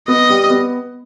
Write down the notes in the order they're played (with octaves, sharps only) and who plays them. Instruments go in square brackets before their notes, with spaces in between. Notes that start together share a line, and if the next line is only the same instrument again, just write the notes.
[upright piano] B3 [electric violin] D#5
[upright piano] G3
B3